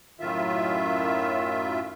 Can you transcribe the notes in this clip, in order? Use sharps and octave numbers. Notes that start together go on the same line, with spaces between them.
F#2 A2 D#3 F4 E5